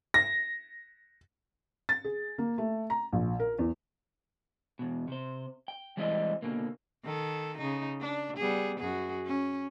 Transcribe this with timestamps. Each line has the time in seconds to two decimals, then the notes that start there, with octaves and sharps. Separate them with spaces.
0.14 A#6
1.89 A6
2.04 G#4
2.38 A#3
2.58 A3
2.90 A#5
3.13 A#1
3.40 A#4
3.59 E2
4.79 E2 B2
5.08 C3 C5
5.68 G5
5.97 E3 G3 G#3 C4 E4 D#5
6.42 B2 D3 A#3
7.04 D#3 A4
7.58 C#3 D#4
8.00 D4
8.37 G3 B3 G#4
8.79 F#2 F#4 G#4
9.26 C#4